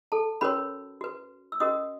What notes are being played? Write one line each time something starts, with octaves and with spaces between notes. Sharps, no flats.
A4 A5
C#4 F#4 A#4 B4 C#5 B5
F#4 B4
E6
C#4 F#4 A#4 D#5 D#6